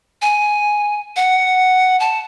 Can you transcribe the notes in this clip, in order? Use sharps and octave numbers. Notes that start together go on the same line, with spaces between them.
G#5
F#5
A5